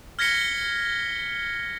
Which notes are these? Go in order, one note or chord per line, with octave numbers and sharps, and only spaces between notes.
F6 G#6 A#6 B6 C#7 G7